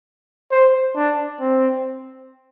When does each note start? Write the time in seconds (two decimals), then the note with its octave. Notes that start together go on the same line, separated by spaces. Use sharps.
0.51 C5
0.96 D4
1.40 C4